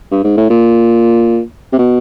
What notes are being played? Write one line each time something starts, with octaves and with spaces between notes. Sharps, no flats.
G2
G#2
A2
A#2
C3
B2